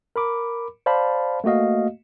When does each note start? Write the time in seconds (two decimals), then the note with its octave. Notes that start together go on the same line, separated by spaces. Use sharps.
0.16 A#4 B5 D6
0.86 C5 D5 F5 A5 B5
1.44 A3 A#3 F#4 D#5 F5